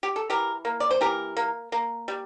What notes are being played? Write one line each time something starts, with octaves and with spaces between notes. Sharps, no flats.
G4
A4
E3 G4 A#4
A#3
D5
C5
E3 G4 A#4
A#3
A#3
G3